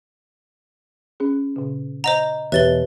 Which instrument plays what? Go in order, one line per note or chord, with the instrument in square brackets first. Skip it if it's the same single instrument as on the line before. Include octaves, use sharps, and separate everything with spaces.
[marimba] C#4 G#4
A#2 C#3
[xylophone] C5 D#5 A#5 [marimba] F#5
[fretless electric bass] E2 B2 [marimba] G4 C#5 E5 [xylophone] B4 A6 G7